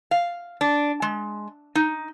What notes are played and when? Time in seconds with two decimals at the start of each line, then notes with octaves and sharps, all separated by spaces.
0.11 F5
0.61 D4
1.02 G#3
1.75 D#4